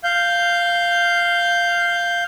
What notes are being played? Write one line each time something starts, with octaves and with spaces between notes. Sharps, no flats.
F5 G6